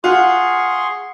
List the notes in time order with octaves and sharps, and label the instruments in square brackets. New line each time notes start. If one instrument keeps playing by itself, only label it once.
[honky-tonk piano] F4 [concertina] G#4 C6 C#6 [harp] F#5 F#6